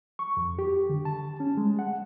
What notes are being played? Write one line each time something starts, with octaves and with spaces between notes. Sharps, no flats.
C#6
F2
G4
D3
A5
C#4
G#3
F#5